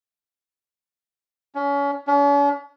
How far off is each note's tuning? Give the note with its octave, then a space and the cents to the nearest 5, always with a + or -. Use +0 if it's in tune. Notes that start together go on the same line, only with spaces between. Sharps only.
C#4 +30
C#4 +45